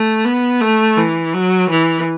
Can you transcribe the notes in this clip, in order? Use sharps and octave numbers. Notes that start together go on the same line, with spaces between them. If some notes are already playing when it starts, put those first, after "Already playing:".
Already playing: A3
B3
A3
E3
F#3
E3